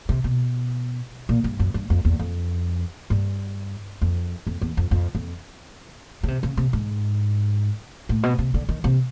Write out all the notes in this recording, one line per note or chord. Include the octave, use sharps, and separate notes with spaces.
C3
B2
A#2
G2
F#2
G2
F2
E2
F2
G2
F2
F2
E2
F2
F2
F2
C#3
C3
C#3
C3
G#2
A2
B2
C3
D3
D#3
C3